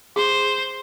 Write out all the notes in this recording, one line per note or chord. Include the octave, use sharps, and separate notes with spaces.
G#4 C5